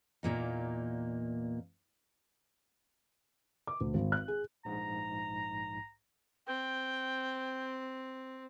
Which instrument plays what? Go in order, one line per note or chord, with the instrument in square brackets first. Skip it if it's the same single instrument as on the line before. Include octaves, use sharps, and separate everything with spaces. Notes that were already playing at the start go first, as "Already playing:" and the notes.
[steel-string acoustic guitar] E2 A#2 A#3 D#4
[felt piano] D6
D2
G#1
F#6
G#4
[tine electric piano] A#1 G#2 [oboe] A#5
[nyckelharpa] C4 [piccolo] G5